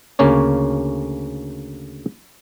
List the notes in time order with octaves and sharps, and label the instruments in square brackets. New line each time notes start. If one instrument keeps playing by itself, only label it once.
[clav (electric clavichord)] D2 C#3 A#3 C#4 C#5